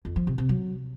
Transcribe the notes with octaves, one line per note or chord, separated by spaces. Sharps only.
F2
F3
C3
C3
F#3